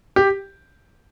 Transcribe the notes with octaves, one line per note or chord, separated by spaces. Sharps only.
G4